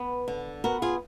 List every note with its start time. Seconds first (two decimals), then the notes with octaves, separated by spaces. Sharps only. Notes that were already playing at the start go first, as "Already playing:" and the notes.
Already playing: B3
0.28 D3
0.64 B3 F#4 A#4
0.82 F4 G#4